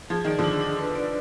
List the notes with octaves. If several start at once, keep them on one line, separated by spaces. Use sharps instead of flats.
F3 G#4
D#3 D5
D3 F3
D4
D4
B4
D5